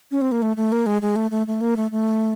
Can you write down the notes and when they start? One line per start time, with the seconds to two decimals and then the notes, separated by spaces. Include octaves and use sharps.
0.11 C#4
0.21 C4
0.32 A#3
0.42 A3
0.56 A3
0.72 A#3
0.86 G#3
1.02 G#3
1.16 A3
1.31 A3
1.47 A3
1.61 A#3
1.76 A3
1.91 A3